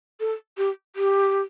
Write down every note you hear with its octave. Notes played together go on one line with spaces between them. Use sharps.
A4
G4
G4